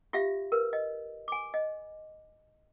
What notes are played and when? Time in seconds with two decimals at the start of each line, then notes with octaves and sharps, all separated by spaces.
0.13 F4 G4 E5 F5
0.52 A#4 B4
0.73 D#5
1.28 G#5 D6
1.54 D#5